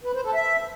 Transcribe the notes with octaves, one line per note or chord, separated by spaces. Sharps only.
B4
C5
A4
E5